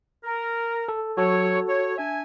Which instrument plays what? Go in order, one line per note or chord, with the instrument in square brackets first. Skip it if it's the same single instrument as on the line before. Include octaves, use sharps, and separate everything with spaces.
[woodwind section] A#4
[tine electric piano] A4
[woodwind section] F#3 C#5 [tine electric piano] F#4 A4
[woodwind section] C#5
D4 E5 G#5